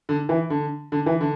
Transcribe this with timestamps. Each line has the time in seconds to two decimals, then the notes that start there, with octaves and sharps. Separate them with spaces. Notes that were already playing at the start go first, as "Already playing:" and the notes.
0.09 D3
0.29 E3
0.50 D3
0.92 D3
1.06 E3
1.21 D3